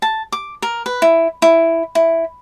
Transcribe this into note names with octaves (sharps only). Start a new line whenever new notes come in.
A5
D6
A#4
B4
E4
E4
E4